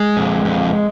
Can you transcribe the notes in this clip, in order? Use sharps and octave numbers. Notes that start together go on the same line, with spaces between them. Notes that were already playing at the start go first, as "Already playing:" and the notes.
Already playing: G#3
F2
F2